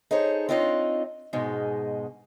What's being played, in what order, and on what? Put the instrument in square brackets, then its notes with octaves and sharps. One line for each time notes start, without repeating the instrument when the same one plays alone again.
[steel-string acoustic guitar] D#4 G#4 A4 C5 C#5
C4 D4 D#4 F4 C#5 D#5
G#2 B2 G#3 D#4